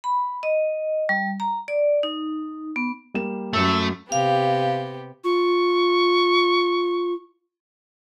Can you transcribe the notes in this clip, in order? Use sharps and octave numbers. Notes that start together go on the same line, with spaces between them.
B5
D#5
G3
A#5
D5
D#4
B3
G3 A#3 E7
F#2 A3 E6
C3 B3 G4 F5
F4 C#6